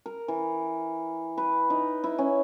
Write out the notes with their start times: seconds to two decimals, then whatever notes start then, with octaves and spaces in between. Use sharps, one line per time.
0.06 A#4
0.28 E3
1.38 B4
1.70 D#4
2.04 E4
2.18 C#4